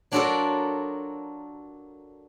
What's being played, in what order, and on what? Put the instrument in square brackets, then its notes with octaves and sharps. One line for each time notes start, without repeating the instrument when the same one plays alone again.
[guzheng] F#3 D4 F4 F#4 A4 A#4